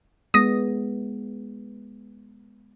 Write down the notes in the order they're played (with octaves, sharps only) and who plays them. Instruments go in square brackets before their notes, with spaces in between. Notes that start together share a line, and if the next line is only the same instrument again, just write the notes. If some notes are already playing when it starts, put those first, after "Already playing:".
[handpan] G#3 B3 [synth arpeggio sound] D#6 A#6